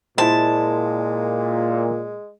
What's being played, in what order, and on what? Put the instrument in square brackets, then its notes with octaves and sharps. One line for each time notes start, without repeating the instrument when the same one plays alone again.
[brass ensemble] A#2 [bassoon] G#3 [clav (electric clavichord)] E4 C5 [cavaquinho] A5